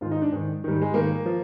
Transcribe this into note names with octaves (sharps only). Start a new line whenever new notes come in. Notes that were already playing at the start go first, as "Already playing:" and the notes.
G#2 D#3 F4
D#4
D4
G#2 D#3
G#2 D#3 G3
G#3
G#2 D#3 A#3
F3